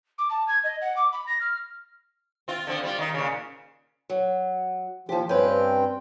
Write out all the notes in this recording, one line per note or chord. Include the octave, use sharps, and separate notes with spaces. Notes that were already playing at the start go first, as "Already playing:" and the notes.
D6
A5
G#6
D#5
F#5
D6
B5
A#6
F6
C4 F4
D3 F3 C4
G3 F4
D#3 D#4
A#2 C#3
F#3
D#2 F3 G4
G2 C4 C#4 B4 G5